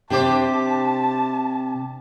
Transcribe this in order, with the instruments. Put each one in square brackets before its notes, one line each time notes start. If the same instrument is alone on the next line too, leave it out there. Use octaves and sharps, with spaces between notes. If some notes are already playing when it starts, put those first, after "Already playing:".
[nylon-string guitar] C3 [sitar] D4 G4 C5 [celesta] G5 D6 [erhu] A5